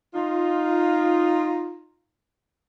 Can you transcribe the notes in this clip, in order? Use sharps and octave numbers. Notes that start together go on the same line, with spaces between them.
D#4 F4